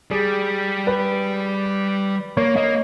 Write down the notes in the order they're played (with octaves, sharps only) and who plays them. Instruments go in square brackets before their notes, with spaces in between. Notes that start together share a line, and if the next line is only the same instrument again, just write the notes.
[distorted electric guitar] G3 [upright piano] G#4
[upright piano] B4
[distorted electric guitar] A#3 [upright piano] C#5
[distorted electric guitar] A#3 [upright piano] D#5